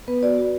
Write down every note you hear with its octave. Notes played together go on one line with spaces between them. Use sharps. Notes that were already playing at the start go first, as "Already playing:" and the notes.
B3 B4
F#4 D5
F#4